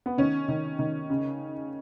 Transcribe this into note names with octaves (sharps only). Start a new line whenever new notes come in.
B3
D#3 C#4
D#3
D#3
C#3